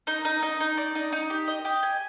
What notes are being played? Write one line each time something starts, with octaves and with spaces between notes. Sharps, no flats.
D#4
D#4
D#4
D#4
D5
D#4
D#4
G4
D#5
G4
G#5